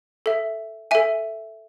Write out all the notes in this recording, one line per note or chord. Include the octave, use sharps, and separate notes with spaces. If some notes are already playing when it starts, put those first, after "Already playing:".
A4 E5
A4 E5 G#5